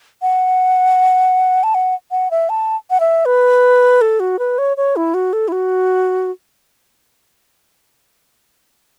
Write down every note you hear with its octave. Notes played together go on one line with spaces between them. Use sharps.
F#5
A5
F#5
F#5
E5
A5
F#5
E5
B4
A4
F#4
B4
C#5
C#5
E4
F#4
A4
E4
F#4